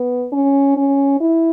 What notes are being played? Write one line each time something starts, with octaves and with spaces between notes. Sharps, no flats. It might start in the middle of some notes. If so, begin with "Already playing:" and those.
Already playing: B3
C#4
C#4
E4